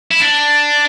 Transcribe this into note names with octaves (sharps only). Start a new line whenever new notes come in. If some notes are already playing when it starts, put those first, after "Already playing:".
E4
D4